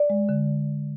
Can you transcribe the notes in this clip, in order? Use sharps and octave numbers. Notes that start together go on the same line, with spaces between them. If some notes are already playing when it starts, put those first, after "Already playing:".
Already playing: D5
G#3
D3